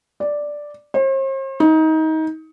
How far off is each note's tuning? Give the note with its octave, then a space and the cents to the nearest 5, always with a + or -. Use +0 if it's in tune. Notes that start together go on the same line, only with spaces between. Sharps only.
D5 +0
C5 +45
D#4 +25